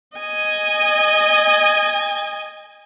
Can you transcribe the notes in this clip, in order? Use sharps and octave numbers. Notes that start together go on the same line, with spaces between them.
D#5 G#5